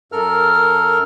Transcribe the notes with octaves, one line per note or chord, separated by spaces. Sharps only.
F#2 A4 A#4 F6